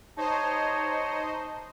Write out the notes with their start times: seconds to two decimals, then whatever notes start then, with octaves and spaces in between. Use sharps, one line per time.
0.17 D#4 G4 C5 C#5 D#5 A5